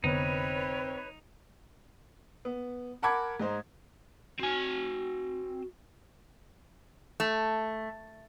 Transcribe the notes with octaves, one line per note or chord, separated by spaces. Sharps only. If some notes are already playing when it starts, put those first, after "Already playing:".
F1 D3 B3 C4 D#4 B4 C#5
B3
A#4 F#5 A5 B5 D6 G#6
G#2 D#4 C5
C4 F#4 G#5
A3